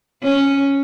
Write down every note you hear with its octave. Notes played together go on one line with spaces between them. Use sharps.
C#4